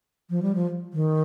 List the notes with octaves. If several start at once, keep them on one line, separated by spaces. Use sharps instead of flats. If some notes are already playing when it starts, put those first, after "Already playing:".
F3
G3
F3
D#3